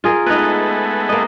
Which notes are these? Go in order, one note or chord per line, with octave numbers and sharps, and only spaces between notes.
F4 G#4 A#4
G#3 A3 B3 D#4 B4
A#3 D#5